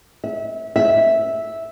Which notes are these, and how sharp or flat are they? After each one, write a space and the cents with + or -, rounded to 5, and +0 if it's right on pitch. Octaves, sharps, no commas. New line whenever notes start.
E5 -25
E5 -5